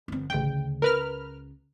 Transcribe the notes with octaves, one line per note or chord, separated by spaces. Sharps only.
G1 C4
A1 D2 C#3 G5
C#2 A#4 B4 F6